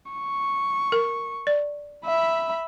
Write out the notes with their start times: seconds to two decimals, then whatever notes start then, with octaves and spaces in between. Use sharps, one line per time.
0.12 C#6
0.92 A#4
1.47 D5
2.05 E5 B5